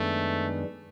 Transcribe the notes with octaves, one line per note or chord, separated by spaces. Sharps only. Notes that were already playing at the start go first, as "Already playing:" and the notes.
Already playing: F#2 D#3 G#3 A3 B3 D4